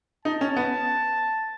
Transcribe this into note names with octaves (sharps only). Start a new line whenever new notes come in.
D#4 A5
C#4
B3